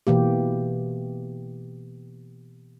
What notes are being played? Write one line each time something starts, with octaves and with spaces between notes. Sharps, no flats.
B2 E3 A#3 G4